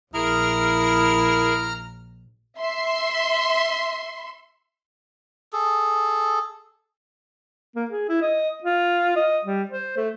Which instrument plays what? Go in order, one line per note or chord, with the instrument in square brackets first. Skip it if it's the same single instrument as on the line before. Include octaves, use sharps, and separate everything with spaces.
[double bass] A#1 [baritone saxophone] E4 [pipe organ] G#4 A#4 [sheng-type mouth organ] A#5 F6
[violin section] E5 C6
[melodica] G#4 A4
[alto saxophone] A#3
G#4
E4
D#5
F4
D#5
G3
C5
A3